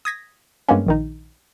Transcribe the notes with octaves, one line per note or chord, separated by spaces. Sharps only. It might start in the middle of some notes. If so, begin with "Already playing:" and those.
D#6 G#6 A#6 B6
G2 G#3 A#3 B3 C#4
A#1 D#3 D#4